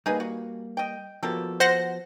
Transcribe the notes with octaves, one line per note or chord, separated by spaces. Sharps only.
G3 A#3 D#4 G#4 B4
F#4
D#5 G5
F3 G3 A#3 B3 F#4 A4
C5 F#5 A#6